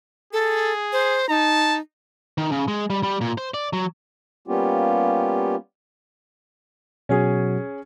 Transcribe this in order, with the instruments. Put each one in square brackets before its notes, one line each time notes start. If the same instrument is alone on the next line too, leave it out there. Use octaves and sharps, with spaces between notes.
[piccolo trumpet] G#4 [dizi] A4
[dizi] C5
[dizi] D#4 [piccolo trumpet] A5
[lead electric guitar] D#3
C#3
G#3
G3
G3
A#2
C5
D5
F#3
[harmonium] G3 A#3 B3 C#4 F4 G4
[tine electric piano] B2 F#3 F#4 [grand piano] C#4 G#4